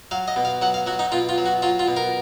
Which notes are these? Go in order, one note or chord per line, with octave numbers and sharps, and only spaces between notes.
F#3 F5
D#5
B2
F5
F#3 F#5
F5
F#3 F#4
D#4
B2 F4
F4
F#3
F#4
F#3 F4
F4
B2
A#4